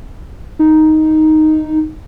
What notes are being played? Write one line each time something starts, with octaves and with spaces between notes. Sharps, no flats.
D#4